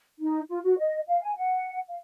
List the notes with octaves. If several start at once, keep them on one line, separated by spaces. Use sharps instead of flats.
D#4
F4
F#4
D#5
F5
G#5
F#5
F5